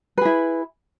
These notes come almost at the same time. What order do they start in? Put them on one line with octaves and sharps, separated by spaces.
B4 G#4 E4